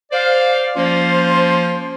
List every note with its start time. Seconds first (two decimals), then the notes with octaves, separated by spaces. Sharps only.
0.12 C5 D5 F5
0.76 F3 A#3 C#4 F4 C5